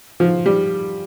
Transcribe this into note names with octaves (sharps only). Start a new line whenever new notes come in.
F3
G3